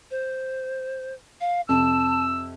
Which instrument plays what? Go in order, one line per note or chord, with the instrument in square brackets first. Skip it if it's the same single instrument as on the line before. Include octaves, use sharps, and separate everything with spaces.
[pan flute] C5
F5
[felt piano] F2 C3 [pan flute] A5 [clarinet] E6